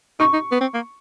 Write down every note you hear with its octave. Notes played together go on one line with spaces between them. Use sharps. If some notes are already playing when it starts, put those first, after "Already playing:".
D#4 C#6
D#4
B3
C4
A#3